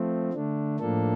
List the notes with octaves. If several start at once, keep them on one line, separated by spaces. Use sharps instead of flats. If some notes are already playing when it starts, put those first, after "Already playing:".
Already playing: F3 A3 C4
D3 A3 D4
A2 F3 A#3 D4 A4